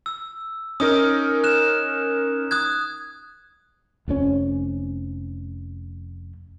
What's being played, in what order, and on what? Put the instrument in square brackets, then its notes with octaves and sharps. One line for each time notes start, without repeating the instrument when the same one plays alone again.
[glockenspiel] E6
[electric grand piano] C#4 D#4 A#4 [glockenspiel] D#6
[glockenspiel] F#6 E7
D#6 F#6 G#6
[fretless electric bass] F1 F2 C#4